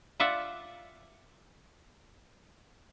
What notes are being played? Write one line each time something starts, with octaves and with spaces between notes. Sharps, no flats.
F4 D5 E5 F#5